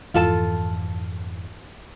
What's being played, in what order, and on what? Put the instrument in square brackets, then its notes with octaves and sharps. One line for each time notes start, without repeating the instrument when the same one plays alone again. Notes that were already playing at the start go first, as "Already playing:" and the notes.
[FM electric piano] F2 G#2 E3 [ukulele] F4 A4 A5